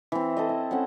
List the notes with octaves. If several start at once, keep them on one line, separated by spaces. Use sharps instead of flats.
E3 C4
A4 C5 D#5
E4
C4 C#4 A4 F#5